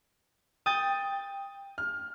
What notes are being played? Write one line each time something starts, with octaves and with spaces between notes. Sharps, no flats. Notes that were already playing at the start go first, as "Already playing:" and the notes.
G5 D#6 G6 A6
F6